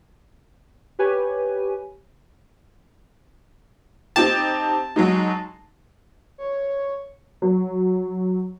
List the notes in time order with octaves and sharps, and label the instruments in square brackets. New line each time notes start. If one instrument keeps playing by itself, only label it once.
[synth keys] G4 B4 C#5 G#5
[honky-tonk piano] C4 D#4 G4 [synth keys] A5
[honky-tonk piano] F#3 G#3 D#4
[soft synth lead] C#5
[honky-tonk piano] F#3